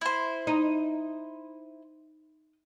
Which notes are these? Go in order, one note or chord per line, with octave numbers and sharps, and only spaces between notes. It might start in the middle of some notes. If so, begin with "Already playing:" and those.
E4 C5
D#4